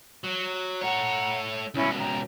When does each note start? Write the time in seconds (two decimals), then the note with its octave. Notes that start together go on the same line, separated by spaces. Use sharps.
0.24 F#3
0.81 A3 C#5 F#5 A#5
1.74 C#2 B2 C#4 E4 B5
1.97 G5 A#5